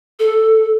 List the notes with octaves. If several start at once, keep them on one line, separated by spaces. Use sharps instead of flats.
A4